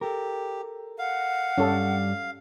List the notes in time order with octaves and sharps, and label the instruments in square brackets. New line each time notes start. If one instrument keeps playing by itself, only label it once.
[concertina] G4 [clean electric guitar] A4 A#4
[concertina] F5 [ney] F#5
[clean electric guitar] G2 G3 [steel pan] C#4 A4